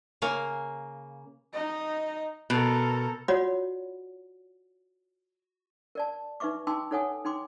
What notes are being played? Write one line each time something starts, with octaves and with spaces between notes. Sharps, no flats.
C#3 A#3 G#5
D#4 D#5
B2 A4 A#4
F4 F#4 C#5 D5 F#5 B5
A#4 D5 A5
D#4 B4 E5 C#6 D6
D#4 G5 A5 C6 D6 E6
D#4 A4 C#5 F#5 G#5 D#6
D#4 G5 C6 D6